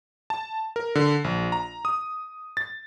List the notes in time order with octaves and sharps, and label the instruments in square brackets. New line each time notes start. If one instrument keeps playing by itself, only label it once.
[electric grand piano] A5
A#4
D3
A#1
A#5
D#6
A6